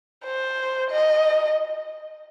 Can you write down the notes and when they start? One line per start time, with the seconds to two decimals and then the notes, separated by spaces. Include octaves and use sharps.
0.25 C5
0.90 D#5